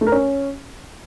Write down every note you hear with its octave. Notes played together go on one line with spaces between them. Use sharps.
A3
A#4
C#4